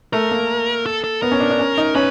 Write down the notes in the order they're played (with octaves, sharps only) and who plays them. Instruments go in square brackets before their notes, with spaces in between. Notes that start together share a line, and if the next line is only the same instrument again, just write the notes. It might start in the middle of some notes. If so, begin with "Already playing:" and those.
[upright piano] A3 [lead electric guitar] A#4
[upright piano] A#3
[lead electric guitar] A4
A4
[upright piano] B3 [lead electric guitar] A#4
[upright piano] C#4
D4
D4
C#4
D#4
[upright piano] C#4 [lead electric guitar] B4